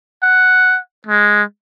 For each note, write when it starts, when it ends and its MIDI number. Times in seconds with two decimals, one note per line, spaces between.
0.23 0.78 78
1.07 1.43 56